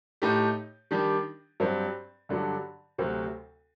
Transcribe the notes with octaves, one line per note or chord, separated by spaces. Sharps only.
A2 A3 D#4 G4
D#3 G3 D4 G4
G2 F#3 C4
G2 D3 F#3
D2 C3 F#3 C4